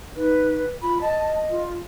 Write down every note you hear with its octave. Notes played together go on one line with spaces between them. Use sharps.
D#4 B4
F4 B5
D#5 A5
F4